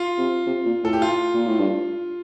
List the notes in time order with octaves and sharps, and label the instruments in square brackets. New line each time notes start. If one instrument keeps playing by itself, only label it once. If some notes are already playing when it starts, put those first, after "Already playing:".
Already playing: [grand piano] F4
[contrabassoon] C3
C3
A#2
[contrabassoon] A2 [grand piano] A4
[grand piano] G4
F4
[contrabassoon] A#2
A2
G2